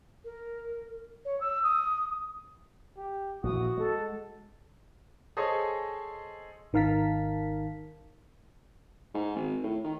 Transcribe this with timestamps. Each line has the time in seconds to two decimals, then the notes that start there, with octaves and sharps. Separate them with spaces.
0.24 A#4
1.25 C#5
1.41 E6
1.64 D#6
2.97 G4
3.43 A#1 E3 F#4 D#6
3.77 G#3 A4
5.37 G#4 A4 C5 C#5 D#5 G#5
6.73 G#1 D#3 A#4 F5 A5 B6
9.14 G#2
9.36 G#1
9.63 A2
9.84 D#3